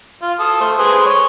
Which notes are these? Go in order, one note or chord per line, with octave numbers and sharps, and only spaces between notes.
F4
A4 D#6
A3 C5
G#4 B4 C5
C#5